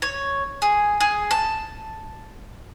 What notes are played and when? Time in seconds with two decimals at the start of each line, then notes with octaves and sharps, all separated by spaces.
0.02 C#5
0.62 G#4
1.00 G#4
1.31 A5